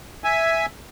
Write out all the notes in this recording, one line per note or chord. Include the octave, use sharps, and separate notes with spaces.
E5 G#5